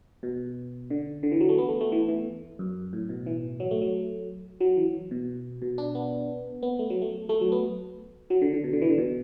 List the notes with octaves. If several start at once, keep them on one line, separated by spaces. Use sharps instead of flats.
B2
D3
D3
E3
F#3
A3
B3
A3
A3
E3
E3
F#2
A2
B2
E3
F#3
A3
F#3
F#3
E3
B2
B2
D4
B3
B3
A3
F#3
A3
A3
F#3
B3
F#3
D3
D3
B2
D3
E3
D3
B2